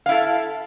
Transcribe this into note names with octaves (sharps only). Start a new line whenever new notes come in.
E4 A4 F5